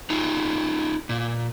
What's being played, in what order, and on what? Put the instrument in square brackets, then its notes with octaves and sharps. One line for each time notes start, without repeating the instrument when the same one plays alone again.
[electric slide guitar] D#4 F4 G#4
A#2